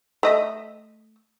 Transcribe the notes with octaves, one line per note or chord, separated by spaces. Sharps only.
A3 D#5 E5